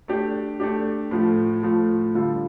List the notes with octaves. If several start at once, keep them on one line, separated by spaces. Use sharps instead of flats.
A3 D4 G4
A3 D4 G4
A2 F3 A3
A2 F3 A3
D3 G3 F4 A4